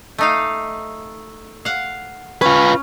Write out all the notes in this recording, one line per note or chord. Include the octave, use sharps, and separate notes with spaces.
A3 D#4 F5
F5 F#5
C#4 F4 B4